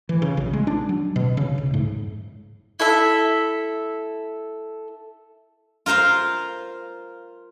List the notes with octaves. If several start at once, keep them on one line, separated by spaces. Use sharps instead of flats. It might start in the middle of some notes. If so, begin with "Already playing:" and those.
E3
C#3
A#1
G#3
D4
F#3
B2
C#3
D1
G#2
E4 A4 E5
F4 A#4 C5 F5